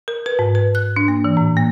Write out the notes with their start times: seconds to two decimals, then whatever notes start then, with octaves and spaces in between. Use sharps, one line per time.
0.08 A#4
0.26 B4
0.39 G#2
0.55 B4
0.75 F#6
0.96 D4
1.08 A#3
1.24 E3
1.37 A2
1.57 A#3